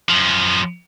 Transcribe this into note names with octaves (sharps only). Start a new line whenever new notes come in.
F#2 F3